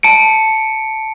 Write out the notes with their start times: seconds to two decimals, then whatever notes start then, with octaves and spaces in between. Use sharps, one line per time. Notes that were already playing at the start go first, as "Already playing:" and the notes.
0.03 A5 C#7 D7